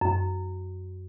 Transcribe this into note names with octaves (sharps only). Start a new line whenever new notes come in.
F#2